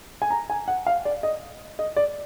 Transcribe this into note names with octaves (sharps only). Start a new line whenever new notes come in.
G#5
A#5
G#5
F#5
F5
D5
D#5
D#5
D5